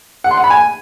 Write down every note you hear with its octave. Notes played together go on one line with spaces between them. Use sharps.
F#5
C6
F#5
B5
G#5